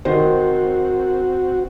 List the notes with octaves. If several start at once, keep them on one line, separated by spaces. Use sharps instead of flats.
D#3 C4 F#4 C5